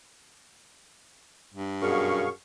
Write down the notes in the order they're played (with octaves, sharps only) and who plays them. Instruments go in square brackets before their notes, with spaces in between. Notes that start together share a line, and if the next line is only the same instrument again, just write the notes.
[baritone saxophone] G2
[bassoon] F#2 [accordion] B2 F5 C#6 [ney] G#4